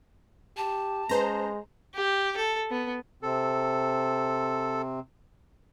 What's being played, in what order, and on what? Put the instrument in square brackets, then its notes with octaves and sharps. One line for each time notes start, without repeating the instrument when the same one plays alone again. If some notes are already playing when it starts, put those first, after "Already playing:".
[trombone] G4 [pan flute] A5
[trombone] G#3 [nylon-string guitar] C#4 B4 [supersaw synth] C5 A#5
[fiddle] G4
A4
B3
[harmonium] C3 C4 [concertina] A4